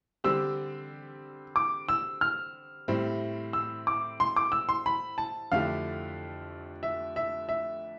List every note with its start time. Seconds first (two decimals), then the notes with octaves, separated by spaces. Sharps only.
0.24 D3 G3 C4 G4 E6
1.56 D6
1.89 E6
2.21 F6
2.88 A2 G3 C4 E4
3.53 E6
3.87 D6
4.20 C6
4.36 D6
4.52 E6
4.69 C6
4.86 B5
5.18 A5
5.52 F2 D3 A3 E4 G4 F5
6.83 E5
7.16 E5
7.49 E5